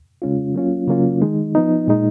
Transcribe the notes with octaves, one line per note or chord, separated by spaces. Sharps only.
C#3 G#3 C#4 F4
F#3 A#3 C#4 F4
C#3 F#3 A#3 C#4 F4
D#3 G#3 D#4
F3 B3 D#4
A#2 G#3 D#4